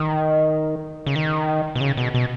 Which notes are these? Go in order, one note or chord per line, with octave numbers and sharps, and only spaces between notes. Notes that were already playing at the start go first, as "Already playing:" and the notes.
Already playing: D#3
C#3
D#3
B2
C#3
B2
B2